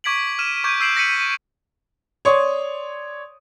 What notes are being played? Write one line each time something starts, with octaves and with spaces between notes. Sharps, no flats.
C#6 D6 G#6 B6 D7 F#7
F6 D#7 E7
C#6 D6 G6 G#6 D7
E6 G6 C7 D7 E7 F#7
A#6 B6 C#7 D#7 F#7
C#5 D5 C6 C#6 D#6